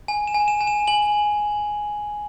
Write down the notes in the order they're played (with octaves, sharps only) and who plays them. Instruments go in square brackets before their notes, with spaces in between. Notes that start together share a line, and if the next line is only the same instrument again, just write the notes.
[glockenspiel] G#5
E7
G#5
E7
G#5
E7
G#5 F#7